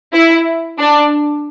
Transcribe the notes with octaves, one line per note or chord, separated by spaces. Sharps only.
E4
D4